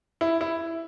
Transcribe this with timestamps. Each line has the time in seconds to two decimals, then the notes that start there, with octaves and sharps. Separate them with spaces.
0.21 E4
0.41 E4